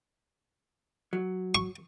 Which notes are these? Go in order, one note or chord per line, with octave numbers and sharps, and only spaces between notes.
F#3
C#6